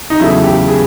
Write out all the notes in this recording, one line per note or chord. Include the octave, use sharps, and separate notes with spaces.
D#4
E2 C#3 F#3 A3 E4
G4
G#4